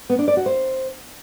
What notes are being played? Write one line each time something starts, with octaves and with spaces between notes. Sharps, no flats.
B3
D4
D5
F#4
C5